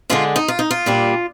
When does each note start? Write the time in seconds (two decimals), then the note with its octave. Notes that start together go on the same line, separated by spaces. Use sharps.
0.10 D3 G#3 D4 F4
0.36 D#4
0.48 F4
0.59 D#4
0.71 F4
0.86 A#2 G3 D4